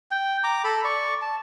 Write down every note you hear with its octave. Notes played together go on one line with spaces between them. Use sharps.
G5
A#5 D6
A4 B5
D5 C#6
A5